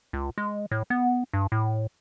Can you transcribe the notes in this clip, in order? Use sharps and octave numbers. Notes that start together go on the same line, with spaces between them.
C#2
G#3
A2
B3
G2
A2